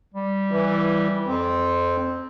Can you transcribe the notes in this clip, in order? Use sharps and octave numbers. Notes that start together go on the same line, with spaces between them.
G3
E3
F2 C4